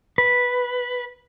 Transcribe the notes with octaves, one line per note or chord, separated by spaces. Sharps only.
B4